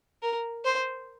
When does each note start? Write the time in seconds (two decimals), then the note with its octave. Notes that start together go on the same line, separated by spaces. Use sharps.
0.22 A#4
0.65 C5